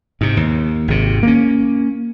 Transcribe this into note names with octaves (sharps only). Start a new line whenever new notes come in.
G#2 C3
D#2
G#1 C3
A#3 C#4